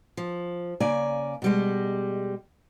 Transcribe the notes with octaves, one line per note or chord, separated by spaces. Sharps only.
F3
C#3 A#3 D5 G#5
B2 G3 G#3